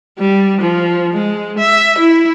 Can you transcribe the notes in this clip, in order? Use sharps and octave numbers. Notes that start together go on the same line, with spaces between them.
G3
F3
G#3
E5
E4